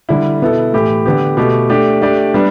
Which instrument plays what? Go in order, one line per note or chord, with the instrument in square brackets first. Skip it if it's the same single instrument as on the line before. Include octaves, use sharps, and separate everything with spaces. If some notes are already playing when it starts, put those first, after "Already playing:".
[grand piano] D3 G3 E4
B2 B3 E4 A4
A2 E3 A3 G4
D3 B3 G4
B2 A3 G4
A3 D4 G4 D5
A3 D4 G4 D5
G3 B3 D4